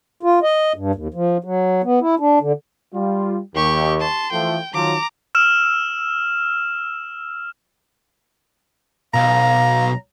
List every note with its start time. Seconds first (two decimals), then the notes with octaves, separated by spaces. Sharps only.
0.23 F4
0.43 D#5
0.76 G2
0.95 D#2
1.14 F3
1.44 F#3
1.84 B3
2.01 E4
2.20 D4
2.41 D3
2.94 G3 F4
3.55 D#2 G4 C#6
4.00 A5 C6
4.32 E3 F3 A3 G5
4.74 D#3 F3 F#3 A#5 D6
5.35 E6 F6 E7
9.14 B1 F5 A#5